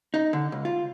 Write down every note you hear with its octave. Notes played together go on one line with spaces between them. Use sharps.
D#4
D3
C#2
F4